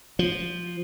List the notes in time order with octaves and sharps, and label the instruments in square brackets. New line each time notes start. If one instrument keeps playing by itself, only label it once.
[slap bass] F3